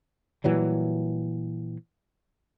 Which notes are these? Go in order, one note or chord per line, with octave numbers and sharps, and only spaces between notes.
A#2 E3 F#3 G3